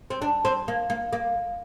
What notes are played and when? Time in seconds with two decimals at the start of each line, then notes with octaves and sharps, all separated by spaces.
0.10 C4
0.22 D4
0.45 C4
0.68 A#3
0.90 A#3
1.13 A#3